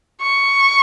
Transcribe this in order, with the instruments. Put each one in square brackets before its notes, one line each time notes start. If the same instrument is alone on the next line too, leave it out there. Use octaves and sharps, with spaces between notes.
[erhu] C#6